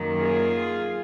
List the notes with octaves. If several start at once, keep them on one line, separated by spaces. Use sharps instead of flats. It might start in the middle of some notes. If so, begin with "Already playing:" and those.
Already playing: F#2 D#3 A#3
F4 G#4